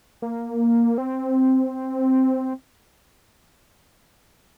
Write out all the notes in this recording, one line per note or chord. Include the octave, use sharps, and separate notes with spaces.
A#3
C4